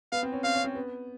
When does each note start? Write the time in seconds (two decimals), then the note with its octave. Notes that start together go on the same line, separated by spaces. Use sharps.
0.12 B3 F5
0.23 C4
0.33 C#4
0.44 C4 F5
0.54 C#4
0.64 C4
0.75 B3